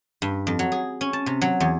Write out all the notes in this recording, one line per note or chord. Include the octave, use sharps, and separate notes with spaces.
G2
F2
F#3
G#4
C#4
A5
C3
F#3
E2